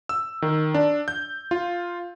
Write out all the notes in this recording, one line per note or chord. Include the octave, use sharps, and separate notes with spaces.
E6
D#3
D4
G6
F4